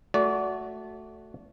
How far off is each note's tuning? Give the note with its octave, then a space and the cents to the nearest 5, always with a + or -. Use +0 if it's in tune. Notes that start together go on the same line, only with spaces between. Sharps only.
A3 +0 F#4 +0 D5 -30